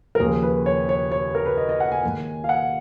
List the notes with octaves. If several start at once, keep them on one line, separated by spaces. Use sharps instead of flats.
A#4
D#2 C#3 F3 A#3 G#4
B4
C#5
C#5
C#5
A#4
B4
D#5
D#5
F#5
G#5
G#2 D#3 A#3
F5
F#5